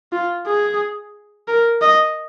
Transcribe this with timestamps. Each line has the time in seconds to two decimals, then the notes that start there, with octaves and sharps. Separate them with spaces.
0.13 F4
0.47 G#4
1.48 A#4
1.82 D#5